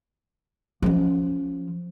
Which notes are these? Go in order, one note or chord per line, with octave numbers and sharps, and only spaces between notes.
F3 C#4